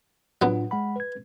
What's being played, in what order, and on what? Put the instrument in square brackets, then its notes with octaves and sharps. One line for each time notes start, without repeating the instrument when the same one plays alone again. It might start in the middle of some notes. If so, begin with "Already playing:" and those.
[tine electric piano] A2 D4 F4 [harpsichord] F#3 B3
[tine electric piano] G#3 F#5 B5
B4 G#6